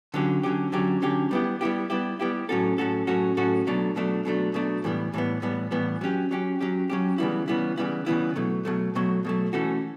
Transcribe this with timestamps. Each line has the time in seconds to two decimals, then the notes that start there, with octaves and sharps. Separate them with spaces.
0.14 D3 F#3 C#4 G4
0.43 D3 F#3 C#4 G4
0.72 D3 F#3 C#4 G4
1.02 D3 F#3 C#4 G4
1.31 G3 B3 E4 G4
1.61 G3 B3 E4 G4
1.90 G3 B3 E4 G4
2.19 G3 B3 E4 G4
2.49 A2 F#3 C#4 F#4 A4
2.78 A2 F#3 C#4 F#4 A4
3.07 A2 F#3 C#4 F#4 A4
3.37 A2 F#3 C#4 F#4 A4
3.67 B2 F#3 A3 D4
3.96 B2 F#3 A3 D4
4.25 B2 F#3 A3 D4
4.54 B2 F#3 A3 D4
4.84 A2 E3 G3 B3
5.14 A2 E3 G3 B3
5.42 A2 E3 G3 B3
5.71 A2 E3 G3 B3
6.01 F#3 C#4 G4
6.31 F#3 C#4 G4
6.60 F#3 C#4 G4
6.90 F#3 C#4 G4
7.18 C#3 E3 G3 B3 E4
7.48 C#3 E3 G3 B3 E4
7.78 C#3 E3 G3 B3 E4
8.06 C#3 E3 G3 B3 E4
8.36 B2 F#3 A3
8.65 B2 F#3 A3
8.95 B2 F#3 A3
9.25 B2 F#3 A3
9.53 E3 A3 C#4 F#4 A4